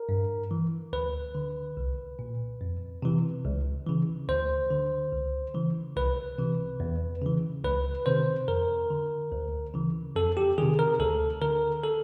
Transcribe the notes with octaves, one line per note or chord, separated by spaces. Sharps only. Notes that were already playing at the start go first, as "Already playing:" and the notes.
Already playing: A#4
G2
E3
D2 B4
D3
C2
A#2
F2
C3 E3
C#2
C#3 E3
D2 C5
D3
C#2
C#3 E3
C2 B4
C3 E3
E2
C#3 E3
C#2 B4
C3 D#3 C5
F2 A#4
D3
D2
C#3 E3
F2 A4
G4
C3 D#3 G#4
A#4
D2 A4
D3 A#4
A4